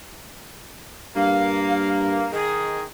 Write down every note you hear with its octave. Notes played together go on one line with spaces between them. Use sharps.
G2 A#3 F5
D#3 G#4